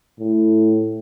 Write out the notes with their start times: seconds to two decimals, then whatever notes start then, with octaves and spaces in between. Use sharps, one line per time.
0.20 A2